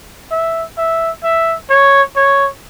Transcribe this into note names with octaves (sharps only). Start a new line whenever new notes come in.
E5
E5
E5
C#5
C#5